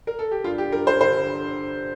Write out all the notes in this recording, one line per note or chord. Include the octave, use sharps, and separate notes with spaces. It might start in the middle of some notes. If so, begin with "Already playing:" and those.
A#4
A4
G4
G2 F4
G4
G2 A#4
C5
D3 C5